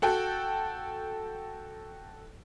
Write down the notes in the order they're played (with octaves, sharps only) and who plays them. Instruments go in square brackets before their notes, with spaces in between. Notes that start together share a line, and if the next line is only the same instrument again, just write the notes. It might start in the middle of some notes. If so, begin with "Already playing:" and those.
[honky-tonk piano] F#4 A4 G5